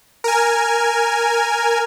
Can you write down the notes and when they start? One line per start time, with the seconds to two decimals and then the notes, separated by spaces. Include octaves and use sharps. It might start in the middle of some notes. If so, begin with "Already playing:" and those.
0.24 A#4 G#5